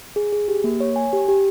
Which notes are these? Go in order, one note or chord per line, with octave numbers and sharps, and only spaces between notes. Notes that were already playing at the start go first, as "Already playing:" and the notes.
G#4
G#4
G4
A#3
C#5
G#5
G4
G4